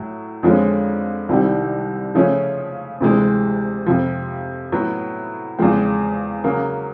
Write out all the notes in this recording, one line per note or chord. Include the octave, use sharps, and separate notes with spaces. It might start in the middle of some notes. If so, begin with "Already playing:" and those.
Already playing: A2 F#3 A3
F2 D3 F3 G#3 C#4
C2 C3 D#3 G3
C#3 F3 A3 C#4
D2 C3 E3 G#3
F2 C3 F3
A2 F#3 B3
E2 C#3 F3 G#3 C4
C#3 F#3 A#3